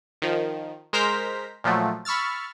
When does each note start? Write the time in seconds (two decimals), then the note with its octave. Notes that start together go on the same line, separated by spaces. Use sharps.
0.22 D#3 F3
0.93 G#3 A#4 C5 A#5 B6
1.64 A#2 F3 F#3 A3
2.05 B5 C#6 E6 F6 A6